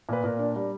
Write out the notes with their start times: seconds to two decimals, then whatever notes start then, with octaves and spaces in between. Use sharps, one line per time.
0.09 A#2 B4
0.24 A#2 A#4
0.39 D4
0.56 G3